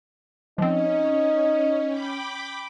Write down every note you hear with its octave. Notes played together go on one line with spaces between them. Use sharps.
F3 C4 C#4 D#4
G5 B5 D6